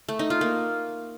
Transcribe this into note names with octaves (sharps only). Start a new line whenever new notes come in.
A3
D#4
F4
A#3